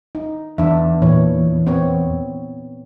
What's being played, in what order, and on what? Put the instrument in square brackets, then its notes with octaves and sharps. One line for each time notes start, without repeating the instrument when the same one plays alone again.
[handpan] D#4
[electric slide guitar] E2 [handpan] D4 E5
[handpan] A#2 E3 C#5
B3 C4 C#5